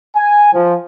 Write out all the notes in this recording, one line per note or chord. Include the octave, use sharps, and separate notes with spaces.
G#5
F3